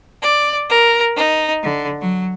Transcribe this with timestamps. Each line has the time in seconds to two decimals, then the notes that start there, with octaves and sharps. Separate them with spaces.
0.22 D5
0.70 A#4
1.15 D#4
1.64 D3
2.02 F#3